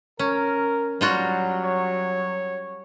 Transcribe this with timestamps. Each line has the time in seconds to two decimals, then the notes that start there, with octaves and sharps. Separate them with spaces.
0.19 C#4 A#4
1.01 F#3 G3 F4 F#4
1.64 C#5